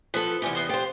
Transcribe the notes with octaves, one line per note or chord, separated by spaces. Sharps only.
F3 B3 A4 B4
E2 C3 G4 G#5
B3 C5 D#5
F4 G4 C5